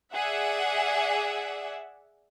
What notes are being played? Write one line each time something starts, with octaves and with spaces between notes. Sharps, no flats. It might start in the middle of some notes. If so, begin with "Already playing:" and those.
G#4 D5 E5 F#5